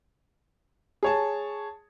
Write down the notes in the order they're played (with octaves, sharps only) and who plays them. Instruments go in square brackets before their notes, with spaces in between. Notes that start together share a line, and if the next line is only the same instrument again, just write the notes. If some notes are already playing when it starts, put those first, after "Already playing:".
[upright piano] G#4 C#5 A5